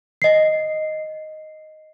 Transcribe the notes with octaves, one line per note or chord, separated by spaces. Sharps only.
D#5 C7